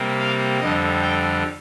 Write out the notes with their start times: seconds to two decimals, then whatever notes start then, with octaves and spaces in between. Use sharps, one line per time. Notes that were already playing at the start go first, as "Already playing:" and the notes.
Already playing: C3 G3 A#3
0.19 F5
0.60 F2 D3 G3 D#5
1.02 G5